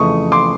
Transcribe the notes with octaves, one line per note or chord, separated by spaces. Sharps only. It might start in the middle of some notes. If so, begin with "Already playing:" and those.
Already playing: F2 C#3 E3 A3 C#6 D#6
C6 D6